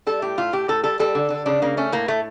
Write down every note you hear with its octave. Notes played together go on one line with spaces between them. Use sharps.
G3 A4
A2 G4
A2 F4
A2 G4
A2 A4
G3 A4
G3 A4
D3
D3
C#3 D4
C#3 A#3
A3 C#4
A2 A#3
A2 A3